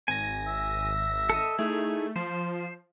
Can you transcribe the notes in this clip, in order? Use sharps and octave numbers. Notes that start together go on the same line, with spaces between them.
G#1 G#5 A#6
E5
A4 D#5
A3 D#4 E4 G#4
F3 C5